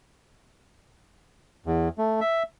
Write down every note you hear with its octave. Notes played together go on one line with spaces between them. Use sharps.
E2
A3
E5